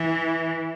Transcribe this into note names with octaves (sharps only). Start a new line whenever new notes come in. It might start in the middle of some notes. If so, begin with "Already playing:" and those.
Already playing: E3